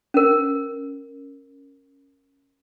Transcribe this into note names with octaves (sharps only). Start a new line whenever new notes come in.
C#4 A#4